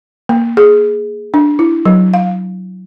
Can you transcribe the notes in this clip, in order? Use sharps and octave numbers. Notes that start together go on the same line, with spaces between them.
A#3
G#4
D4
E4
F#3
F5